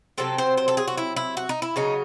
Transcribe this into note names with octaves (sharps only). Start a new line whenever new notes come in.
C3 F#3 C4 A4
C5
C5
A4
G#4
F#4
E4
E4
F#4
D#4
E4
C#3 F#3 C#4 D#4